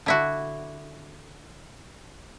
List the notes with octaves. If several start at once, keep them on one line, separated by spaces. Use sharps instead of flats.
D3 E4 F#4